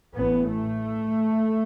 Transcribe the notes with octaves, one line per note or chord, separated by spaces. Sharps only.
A1 A2 B3
A3